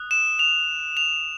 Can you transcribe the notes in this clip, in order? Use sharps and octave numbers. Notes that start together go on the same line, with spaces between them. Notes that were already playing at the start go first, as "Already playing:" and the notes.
Already playing: D#6 F#6
E7
F7
F7